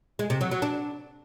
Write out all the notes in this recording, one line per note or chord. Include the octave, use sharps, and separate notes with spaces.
G#3
C3
F#3
F#3
D4